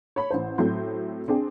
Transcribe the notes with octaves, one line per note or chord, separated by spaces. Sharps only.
C#5 B5
A1 C5
A2 F#3 C4 C6 G6
C4 D4 G#4 G5